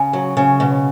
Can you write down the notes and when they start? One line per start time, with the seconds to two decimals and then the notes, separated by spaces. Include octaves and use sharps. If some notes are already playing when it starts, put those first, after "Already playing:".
Already playing: C#3
0.13 F#3
0.37 C#3
0.60 B2